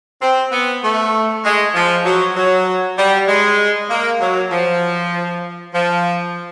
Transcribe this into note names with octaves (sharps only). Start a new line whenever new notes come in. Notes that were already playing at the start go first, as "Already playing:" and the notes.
C4
B3
A3
G#3
F3
F#3
F#3
G3
G#3
A#3
F#3
F3
F3